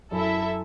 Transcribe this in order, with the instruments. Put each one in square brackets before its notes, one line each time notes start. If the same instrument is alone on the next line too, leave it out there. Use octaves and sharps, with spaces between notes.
[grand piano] F#2 [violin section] E4 A4 E5